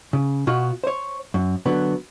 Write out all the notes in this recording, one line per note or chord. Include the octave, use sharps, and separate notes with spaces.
C#3
B2 F4 F#4
C5 C#5
F#2
D3 F#3 B3